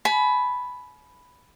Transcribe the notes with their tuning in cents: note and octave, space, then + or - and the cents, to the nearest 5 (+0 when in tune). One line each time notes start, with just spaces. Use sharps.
G#5 +40 B5 +0